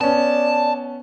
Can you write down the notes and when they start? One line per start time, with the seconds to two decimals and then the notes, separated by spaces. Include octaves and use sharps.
0.01 B3 C#4 D5 A5